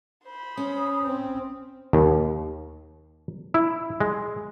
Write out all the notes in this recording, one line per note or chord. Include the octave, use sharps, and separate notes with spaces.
C5 B5
C#4 D#6
C4
D#2
E4
G#3